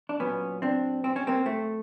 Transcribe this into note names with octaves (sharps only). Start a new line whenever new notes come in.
D4
A#2 F#3 B3 C#4
C4 D4
C4
C#4
A#3 C4
A3